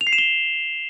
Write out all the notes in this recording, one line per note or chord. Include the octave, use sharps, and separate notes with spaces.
F7
C7
E7
G7